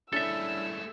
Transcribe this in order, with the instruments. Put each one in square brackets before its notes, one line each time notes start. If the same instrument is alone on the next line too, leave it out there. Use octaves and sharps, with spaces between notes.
[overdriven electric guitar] G#3 A3 [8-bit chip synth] C#4 D4 E4 [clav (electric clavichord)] A4 E5 [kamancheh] E6